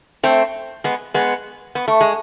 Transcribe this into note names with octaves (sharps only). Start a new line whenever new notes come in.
A3 C4
G#3 B3
G#3 B3
B3
A3
G#3